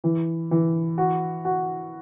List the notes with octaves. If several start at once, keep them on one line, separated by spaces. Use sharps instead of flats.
E3
E3
F#4
F#4